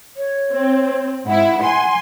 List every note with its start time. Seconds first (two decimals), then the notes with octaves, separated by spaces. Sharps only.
0.17 C#5
0.52 C4
1.27 G#2 E4 F#5
1.63 G#5 C6